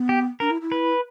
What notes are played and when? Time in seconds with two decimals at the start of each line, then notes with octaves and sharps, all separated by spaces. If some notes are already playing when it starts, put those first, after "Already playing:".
Already playing: B3
0.09 G4
0.40 D4 A#4
0.50 E4
0.61 E4
0.72 B4